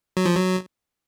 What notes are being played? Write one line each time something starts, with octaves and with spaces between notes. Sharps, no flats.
F#3
F3
F#3